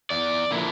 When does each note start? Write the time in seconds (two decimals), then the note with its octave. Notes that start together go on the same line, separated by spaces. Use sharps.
0.10 E2 D5
0.51 D3 F3 A#3 E4